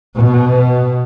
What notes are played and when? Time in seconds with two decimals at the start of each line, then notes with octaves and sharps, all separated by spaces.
0.16 B2